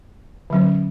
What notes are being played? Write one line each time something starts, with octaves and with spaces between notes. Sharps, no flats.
D3 F#3 C#4